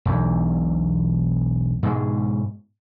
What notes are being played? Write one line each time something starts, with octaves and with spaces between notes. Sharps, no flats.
E1 B1 E2
G#2 B2 G#3